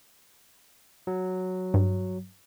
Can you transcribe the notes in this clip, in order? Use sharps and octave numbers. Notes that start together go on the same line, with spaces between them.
F#3
G2